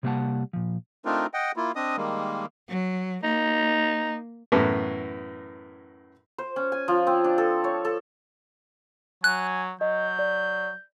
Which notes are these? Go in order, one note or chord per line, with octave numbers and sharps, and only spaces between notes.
C3 G3 A#3 B4 F#5 A5
A#2 F3
A3 C4 D4 D#4 F4 A#4
D#5 F#5 G5
A#3 E4 F4
C4 D4 D#5 D#6
D#3 G3 G#3 A#3
F#3
A#3 D#4
F#2 A2 E3 B3
C5
C#4
G#5
F3
C4
D4
A4
C#5
A4
F#3 G#5 F#6
F#3 D#5 G6
D5